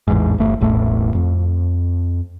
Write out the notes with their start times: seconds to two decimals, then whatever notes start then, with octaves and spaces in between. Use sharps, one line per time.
0.08 A1 E2 G#2
0.38 G1 A3
0.61 E1 A1 A2 A3
1.15 F2